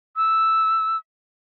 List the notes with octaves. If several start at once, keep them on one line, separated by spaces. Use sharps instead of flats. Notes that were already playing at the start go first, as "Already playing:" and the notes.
E6